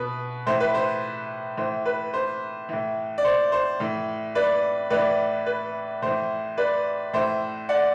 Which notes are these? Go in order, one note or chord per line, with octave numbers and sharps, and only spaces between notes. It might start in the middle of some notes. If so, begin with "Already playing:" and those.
Already playing: B2 B4
A2 E3 C5
B4
C5
A2 E3 C5
B4
C5
A2 E3
D5
C5
C5
A2 E3
B4 D5
A2 E3 B4 D5
B4
A2 E3 C5
B4 D5
A2 E3 C5 E5
D5 F#5